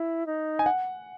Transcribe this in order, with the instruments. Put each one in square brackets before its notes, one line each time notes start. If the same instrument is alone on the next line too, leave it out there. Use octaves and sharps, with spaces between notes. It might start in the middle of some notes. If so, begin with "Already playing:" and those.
Already playing: [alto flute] E4
D#4
[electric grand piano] G#5
F#5